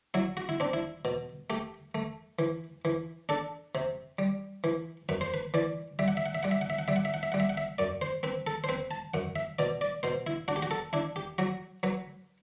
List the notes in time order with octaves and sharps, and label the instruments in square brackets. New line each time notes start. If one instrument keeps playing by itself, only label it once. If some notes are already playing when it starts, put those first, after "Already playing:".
[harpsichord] F#3 E4
F#4
E4
C4 D4
E4
B2
A3 G4
A3
E3
E3
D4 A4
C3
G3
E3
F#2 B4
C5
B4
E3 D5
G3 E5
F#5
E5
F#5
E5
G3 F#5
E5
F#5
E5
F#5
G3 E5
F#5
E5
F#5
E5
G3 F#5
E5
F#5
E5
F#2 D5
C5
C4 B4
A4
C5
C4 B4
A5
F#2 F#5
E5
B2 D5
D5
B2 C5
E4
D4 F#4
G4
F#4
A4
D4 E4
G4
F#3 F#4
F#3 B4